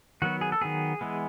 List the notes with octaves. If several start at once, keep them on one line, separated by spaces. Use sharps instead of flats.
D#3 F#3 B3 F#4
G#4
A4
D#3 F#3 B3 G#4
E3 G#3 B3